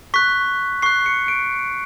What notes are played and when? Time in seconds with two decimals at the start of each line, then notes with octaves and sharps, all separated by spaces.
0.14 C#6 F#6 B6
0.82 C#6 F#6 C7
1.06 C#7
1.28 D7